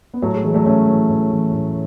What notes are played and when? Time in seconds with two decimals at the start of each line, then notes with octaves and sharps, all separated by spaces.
0.14 B3
0.22 A2 F#3 A3
0.33 G#3
0.43 E3 G#3
0.54 F#3 A3
0.65 A2 A3 C#4
0.88 E3
1.09 A2
1.30 E3
1.52 A2